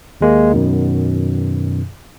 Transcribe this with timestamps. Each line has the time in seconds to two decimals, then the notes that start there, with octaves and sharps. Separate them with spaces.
0.21 D#2 G#3 A#3
0.52 F#2 B2 D#3